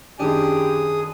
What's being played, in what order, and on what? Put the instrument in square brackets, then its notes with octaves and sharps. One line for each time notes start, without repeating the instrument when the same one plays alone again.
[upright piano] F#2 D#3 D4 [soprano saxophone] G4 [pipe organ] G#4 D#6